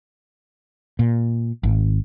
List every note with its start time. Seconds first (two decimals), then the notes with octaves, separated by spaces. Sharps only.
0.99 A#2
1.63 G#1